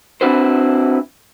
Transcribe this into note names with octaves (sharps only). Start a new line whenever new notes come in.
C4 D4 E4 F#4 B4 C5